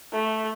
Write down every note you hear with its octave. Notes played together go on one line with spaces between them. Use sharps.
A3